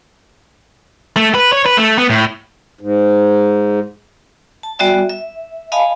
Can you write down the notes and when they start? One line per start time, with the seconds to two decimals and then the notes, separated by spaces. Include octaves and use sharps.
1.16 A3
1.34 B4
1.53 C#5
1.66 B4
1.77 A3
1.98 B3
2.10 A2
2.81 G#2
4.63 A5
4.79 G3 B3 F#4 D5 E5 G#5
5.10 E5
5.72 D#5 F5 G#5 A5 B5